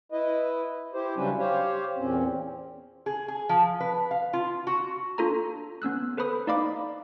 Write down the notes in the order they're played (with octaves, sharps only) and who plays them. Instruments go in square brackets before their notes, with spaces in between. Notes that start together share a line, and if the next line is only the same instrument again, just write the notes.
[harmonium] E4 B4 D#5
E4 G4 C5
C#3 F#3 G3 C#4 D4 B4
G4 C5 C#5 F5
E2 A#2 C4 C#4
[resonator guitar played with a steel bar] G#4
G#4
F3
B4
F5
F4
F#4
[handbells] D4 F4 A4 A#5
B3 C#4 E6 F#6
A4 B4 C5 B5 D#6
D#4 D5 D#5 F5 B5 D6